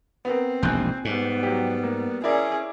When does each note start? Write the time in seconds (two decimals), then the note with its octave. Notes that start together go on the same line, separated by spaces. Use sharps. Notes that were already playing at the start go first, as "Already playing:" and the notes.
0.25 B3 C4 A#4
0.63 E1 A#1 D#2 G#5 F#6 G6
1.05 G#2 G3 B3
1.43 F#3 G4
1.83 A#3
2.24 C#4 E4 G#4 A#4 D5